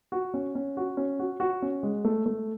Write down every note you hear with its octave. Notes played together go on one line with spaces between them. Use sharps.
F#4
C#4
C#4
F#4
C#4
F#4
F#4
C#4
G#3
A3
A3